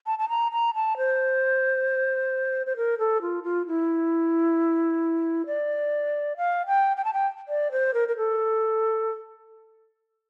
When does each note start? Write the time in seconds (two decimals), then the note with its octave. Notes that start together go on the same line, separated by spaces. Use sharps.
0.06 A5
0.19 A5
0.29 A#5
0.52 A#5
0.74 A5
0.97 C5
2.67 C5
2.77 A#4
2.99 A4
3.22 F4
3.44 F4
3.67 E4
5.46 D5
6.37 F5
6.67 G5
6.97 G5
7.05 A5
7.13 G5
7.48 D5
7.72 C5
7.94 A#4
8.08 A#4
8.17 A4